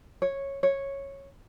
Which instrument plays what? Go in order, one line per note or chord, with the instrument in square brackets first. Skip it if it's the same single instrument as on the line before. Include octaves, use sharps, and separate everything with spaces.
[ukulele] C#5
C#5